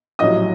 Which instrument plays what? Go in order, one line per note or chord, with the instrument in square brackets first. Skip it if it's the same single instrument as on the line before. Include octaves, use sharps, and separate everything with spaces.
[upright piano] A#1 A2 F#3 D#5 D#6